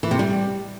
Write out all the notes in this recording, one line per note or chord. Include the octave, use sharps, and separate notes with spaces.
E3
C3
G3